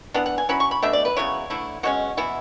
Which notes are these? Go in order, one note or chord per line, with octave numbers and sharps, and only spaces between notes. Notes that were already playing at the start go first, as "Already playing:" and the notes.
E3 B3 D4 F#5
F#5
G#5
F#3 C#4 E4 B5
C#6
B5
B2 A3 D4 E5
D5
B4
C#3 F#3 B3 E4 C#5
D3 A3 E4
B2 G#3 C#4 F#4
E3 B3 E4